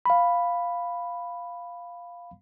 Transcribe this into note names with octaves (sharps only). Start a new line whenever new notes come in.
F5 B5